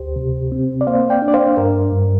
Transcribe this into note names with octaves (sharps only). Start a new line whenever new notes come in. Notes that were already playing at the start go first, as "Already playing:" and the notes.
Already playing: D2 G4 C5
C3
C4
D5
A#3 C5 F5
D5 G5
D4
D5
C5 F5
G2 A#4
G2